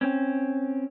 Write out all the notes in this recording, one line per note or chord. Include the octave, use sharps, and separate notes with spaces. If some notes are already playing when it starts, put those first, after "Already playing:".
C4 C#4